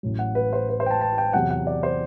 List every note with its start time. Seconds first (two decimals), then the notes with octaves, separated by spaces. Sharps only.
0.03 A1 A2 F#3
0.19 F#5
0.35 B4
0.53 C5
0.69 B4
0.80 C5
0.86 G5
0.91 A5
1.01 A5
1.18 G5
1.33 E2 C3 F#3 F#5
1.51 F#5
1.67 D5
1.83 C5